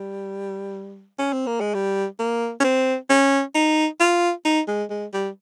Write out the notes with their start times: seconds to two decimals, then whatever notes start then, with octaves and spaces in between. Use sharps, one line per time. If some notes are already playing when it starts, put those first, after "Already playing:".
Already playing: G3
1.19 C#4
1.33 C4
1.47 A#3
1.60 G#3
1.74 G3
2.19 A#3
2.60 C#4
2.64 C4
3.10 C#4
3.55 D#4
4.00 F4
4.45 D#4
4.68 G#3
4.90 G#3
5.13 G3